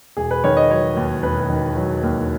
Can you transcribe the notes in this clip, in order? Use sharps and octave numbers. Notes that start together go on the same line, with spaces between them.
E1 G#4
B4
D#3 C#5
D#5
F#3 C#5
D#2
E1 B4
D#3
F#3
D#2